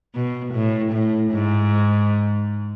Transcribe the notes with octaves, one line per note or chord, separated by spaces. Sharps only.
B2
A2
A2
G#2